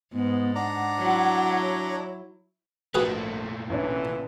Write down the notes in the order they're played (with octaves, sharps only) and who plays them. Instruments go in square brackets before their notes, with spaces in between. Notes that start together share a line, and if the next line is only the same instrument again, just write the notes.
[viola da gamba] G#2 [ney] B3
[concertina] D4 D5 A#5 [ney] F#5
[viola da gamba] F#3 E4
[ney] C#5
[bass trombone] A#1 [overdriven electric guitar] A#2 A3 [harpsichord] F#4 G#4 B4
[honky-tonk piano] A1 C#4 D4 [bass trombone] E3